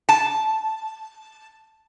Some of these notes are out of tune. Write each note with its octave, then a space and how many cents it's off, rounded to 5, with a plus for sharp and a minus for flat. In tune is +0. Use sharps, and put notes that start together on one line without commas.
A5 -10